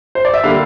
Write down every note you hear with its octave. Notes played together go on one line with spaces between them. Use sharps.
C5
D5
E5
D3 G3 A#3 F5